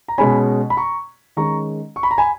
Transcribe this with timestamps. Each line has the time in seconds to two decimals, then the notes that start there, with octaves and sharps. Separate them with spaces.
0.08 A#5
0.18 B2 G#3 C#4 G#5 B5
0.70 B5
0.77 A#5 C#6
1.37 D#3 G#3 C#4 A#5 C#6
1.96 C#6
2.03 B5
2.11 A#5
2.18 G#5 B5